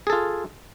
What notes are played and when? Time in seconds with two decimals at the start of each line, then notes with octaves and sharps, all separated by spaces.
0.07 G#4
0.10 A4
0.13 F4